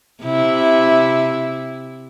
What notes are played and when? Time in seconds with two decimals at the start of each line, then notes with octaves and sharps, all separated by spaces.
0.23 C3 E4